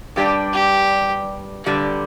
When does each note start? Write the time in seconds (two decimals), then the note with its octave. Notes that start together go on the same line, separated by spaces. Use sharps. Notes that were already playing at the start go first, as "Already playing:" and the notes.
0.16 G2 G3 D4 G4
0.54 G4
1.66 G2 D3 G3